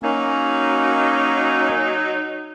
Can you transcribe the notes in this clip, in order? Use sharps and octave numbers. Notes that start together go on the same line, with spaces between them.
F#3 A#3 C#4 D#4